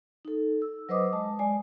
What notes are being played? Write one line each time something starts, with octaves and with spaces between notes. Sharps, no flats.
D#4 A4
E6
F#3 B4 C5 D#5 D6 D#6
G#3 A5
G#3 D5 G#5